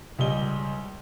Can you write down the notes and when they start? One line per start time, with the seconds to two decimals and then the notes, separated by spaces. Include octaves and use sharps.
0.19 C#2 G3 D#5 G7